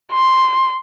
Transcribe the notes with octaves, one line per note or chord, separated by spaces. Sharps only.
C6